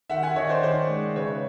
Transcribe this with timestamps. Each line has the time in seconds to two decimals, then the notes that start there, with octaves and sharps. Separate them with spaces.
0.10 D#3 E5 F#5
0.22 F#5 G#5
0.36 D#3 C#5 D#5
0.49 C5 D5
0.62 D#3 C5 D5
0.89 G#3
1.15 C#3 B4 C#5